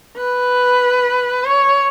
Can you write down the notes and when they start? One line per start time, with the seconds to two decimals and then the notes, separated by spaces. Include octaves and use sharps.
0.17 B4
1.44 C#5